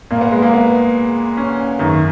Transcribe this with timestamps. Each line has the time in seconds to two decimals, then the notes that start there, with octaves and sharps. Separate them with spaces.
0.11 A#2 A#3
0.21 B3
0.31 G#3
0.42 A#3
0.53 B3
1.37 C#4
1.79 F#2 D#3